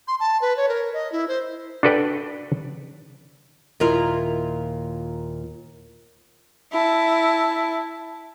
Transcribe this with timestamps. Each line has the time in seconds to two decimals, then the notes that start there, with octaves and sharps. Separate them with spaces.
0.08 C6
0.20 A5
0.41 B4
0.57 C#5
0.69 A#4
0.94 D#5
1.12 E4
1.28 C5
1.83 D4 F#4 A4 B4 D5 G5
3.80 D#2 A#2 E4 F4 A#4
6.72 E4 A5